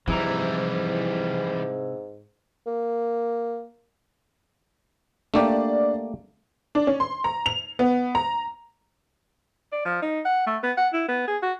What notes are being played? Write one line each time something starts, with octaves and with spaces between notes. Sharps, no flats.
G#2 C3 E3 F3 G3 E4 A#5
A#3
A3 A#3 D4 G4 D5
D4
C#4
C6
A#5
F7
B3
A#5
D5
F3
D#4
F#5
A3
B3
F#5
E4
B3
G#4
F#4